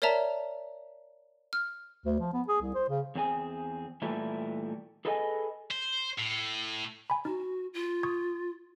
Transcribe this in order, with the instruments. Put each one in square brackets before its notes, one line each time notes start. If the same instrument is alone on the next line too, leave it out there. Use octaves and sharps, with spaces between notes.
[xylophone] A#4 C#5 D5 E5 A5 A#5
F6
[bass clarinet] D2
F3
B3
G#4
C2
C5
C#3
[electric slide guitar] E2 C4 G#4 G#5
A#2 E3 G3 A3 E4
G#4 A4 B4 D#5 F#5 G#5
[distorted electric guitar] C5
A2
[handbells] G#5 B5
[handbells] D#4 [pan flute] F#4
[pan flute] F4
[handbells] C#6 D#6 G#6